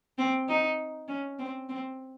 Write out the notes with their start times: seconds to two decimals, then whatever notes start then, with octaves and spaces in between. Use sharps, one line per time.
0.18 C4
0.48 D#4
1.08 C#4
1.39 C4
1.69 C4